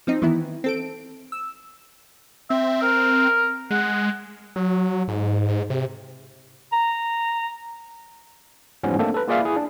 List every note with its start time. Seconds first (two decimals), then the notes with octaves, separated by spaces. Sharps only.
0.07 F3 C4 D#4
0.22 D#3 E3 B3 E4
0.64 C4 A4 D7
1.32 E6
2.50 C4 E5
2.82 A#4
3.71 G#3 F#5
4.56 F#3
5.08 G#2
5.49 G#2
5.70 C3
6.73 A#5
8.83 G#2 E3 F3 G3 B3 C#4
8.99 A3 A#3 C4 D4 A4
9.14 A4 B4
9.28 A#3 F4 G#4 D5 E5 F5
9.41 E4 G#4
9.56 D4